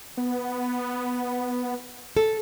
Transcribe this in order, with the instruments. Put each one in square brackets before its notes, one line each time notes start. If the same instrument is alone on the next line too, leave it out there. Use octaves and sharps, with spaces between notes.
[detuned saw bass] B3
[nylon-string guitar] A4